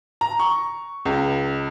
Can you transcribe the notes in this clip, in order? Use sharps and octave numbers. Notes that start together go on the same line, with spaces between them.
A#5
C#6
C#2